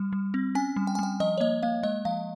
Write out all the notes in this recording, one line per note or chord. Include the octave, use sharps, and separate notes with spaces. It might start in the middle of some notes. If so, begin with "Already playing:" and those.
Already playing: G3
G3
C4
C#4 G#5
G3
G5
G#5
G3 G5
F3 D#5
C#5
A#3 D#5
A#3 F5
G#3 D#5
F3 F5